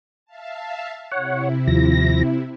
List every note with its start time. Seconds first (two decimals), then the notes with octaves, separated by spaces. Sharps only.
0.25 E5 F5 A5
1.12 C3 E4 C#5 F#5
1.67 D#2 F3 A#6